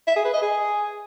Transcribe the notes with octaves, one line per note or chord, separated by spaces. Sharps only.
E5
G#4
B4
D#5
G#4